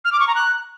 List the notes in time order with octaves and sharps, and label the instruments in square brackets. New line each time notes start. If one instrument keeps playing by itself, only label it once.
[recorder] F6
D6
C#6
A#5
F#6